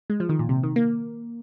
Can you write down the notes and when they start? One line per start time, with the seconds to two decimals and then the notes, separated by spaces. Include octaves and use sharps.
0.10 G#3
0.20 F3
0.29 D#3
0.39 A#2
0.49 C3
0.63 D#3
0.76 A#3